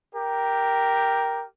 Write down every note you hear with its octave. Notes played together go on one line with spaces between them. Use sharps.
G4 A#4